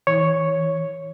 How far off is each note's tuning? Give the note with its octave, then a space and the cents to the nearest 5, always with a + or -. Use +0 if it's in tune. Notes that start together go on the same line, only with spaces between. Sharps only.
E3 -30 C#5 +0